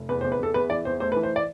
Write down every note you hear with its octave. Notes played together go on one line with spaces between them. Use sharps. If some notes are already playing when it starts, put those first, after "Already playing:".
Already playing: F1
E2 B4
C5
E2
B4
E2 A4
E2 B4
E3 D5
E2 C5
A3 C5
B4
E3
C5
D5